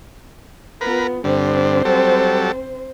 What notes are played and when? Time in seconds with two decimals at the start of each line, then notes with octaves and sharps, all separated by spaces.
0.81 B3 F4 A#4 B4
1.24 G2 D3 C4 C5
1.85 F#3 G3 A4